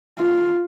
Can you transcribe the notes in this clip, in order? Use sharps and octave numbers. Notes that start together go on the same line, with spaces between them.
F4